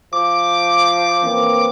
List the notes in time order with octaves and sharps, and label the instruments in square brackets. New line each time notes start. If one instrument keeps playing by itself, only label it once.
[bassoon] F3 [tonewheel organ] D6
[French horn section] E3 A#3 C4